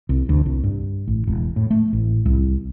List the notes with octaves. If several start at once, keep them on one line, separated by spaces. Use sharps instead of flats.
C2
D2
C2
G2
A1
E1
A2
A3
A1
C2